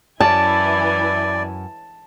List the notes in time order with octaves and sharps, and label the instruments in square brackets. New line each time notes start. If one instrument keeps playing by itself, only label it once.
[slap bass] F#2 [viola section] E3 E4 G#5 [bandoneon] D5 [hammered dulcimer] A5